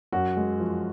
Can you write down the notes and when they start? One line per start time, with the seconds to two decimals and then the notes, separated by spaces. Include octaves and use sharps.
0.12 F#2 F#4
0.37 G#3
0.60 F3